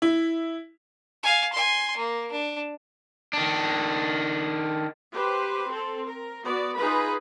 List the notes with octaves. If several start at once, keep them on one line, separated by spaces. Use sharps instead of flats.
E4
F5 G#5
G#5 C6
A#3
D4
D#3 D4
G4 B4 C5
C4 A4
A#4
B3 F#4 D5
D#4 F4 G#4 B4 B5